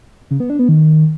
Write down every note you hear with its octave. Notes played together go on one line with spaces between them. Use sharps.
C#3
B3
D4
B3
D#3